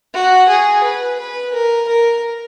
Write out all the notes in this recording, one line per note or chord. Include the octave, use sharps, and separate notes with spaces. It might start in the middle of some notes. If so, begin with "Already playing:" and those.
F#4
G#4
B4
B4
A#4
A#4